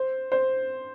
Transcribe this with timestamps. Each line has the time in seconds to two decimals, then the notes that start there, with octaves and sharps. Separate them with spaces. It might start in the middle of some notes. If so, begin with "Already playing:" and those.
Already playing: C5
0.32 C5